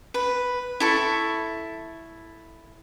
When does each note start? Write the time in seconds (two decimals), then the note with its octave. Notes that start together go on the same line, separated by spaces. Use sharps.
0.14 B4
0.80 E4 A4 C#6